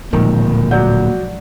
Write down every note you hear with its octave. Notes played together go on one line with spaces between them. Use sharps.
D1 A#2 D#3 F3 G#3
B2 F#3 D5 F#5 G6